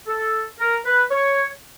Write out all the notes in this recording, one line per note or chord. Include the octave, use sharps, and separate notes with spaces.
A4
A#4
B4
C#5